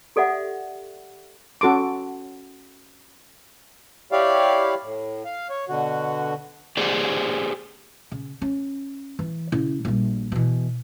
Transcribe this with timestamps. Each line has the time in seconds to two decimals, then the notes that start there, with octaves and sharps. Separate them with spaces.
0.16 G4 A4 D5 E5 F#5
1.61 C#4 F#4 A4 C6 D6
4.12 E4 G4 C#5 D5 F5
4.82 A2
5.25 F5
5.50 C#5
5.69 B2 D3 F#4
6.77 G4 G#4 C5 D5
8.11 C#3
8.42 C#4
9.19 E3
9.52 C#3 E4
9.85 A#1 G3
10.32 B2 E3